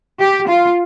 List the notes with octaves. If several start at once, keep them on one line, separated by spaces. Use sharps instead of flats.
G4
F4